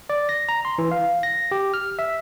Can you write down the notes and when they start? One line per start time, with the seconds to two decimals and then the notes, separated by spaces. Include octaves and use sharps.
0.10 D5
0.29 A#6
0.49 A#5
0.65 C6
0.78 E3
0.91 F5
1.23 A#6
1.51 G4
1.74 F6
1.99 E5